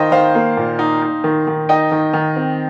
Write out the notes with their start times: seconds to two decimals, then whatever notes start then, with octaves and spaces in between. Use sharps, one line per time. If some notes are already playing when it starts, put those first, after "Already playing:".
Already playing: D#3 D#4 C5 D#5 F5 G5
0.11 D#3 C5 F5
0.35 A#3
0.57 A#2
0.79 D#4
1.02 D#4
1.24 D#3
1.47 D#3
1.69 D#4 D#5 G5
1.92 D#3
2.14 D#3
2.36 C4